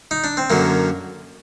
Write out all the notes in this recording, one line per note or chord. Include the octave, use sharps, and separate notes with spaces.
D#4
D4
C4
F#2 D3 F#3 A#3